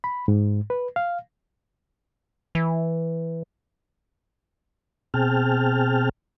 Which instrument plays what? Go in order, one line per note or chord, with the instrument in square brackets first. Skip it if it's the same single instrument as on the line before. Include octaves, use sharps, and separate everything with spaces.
[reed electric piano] B5
G#2
B4
F5
[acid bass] E3
[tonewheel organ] B2 C4 G#4 G5 A5 F6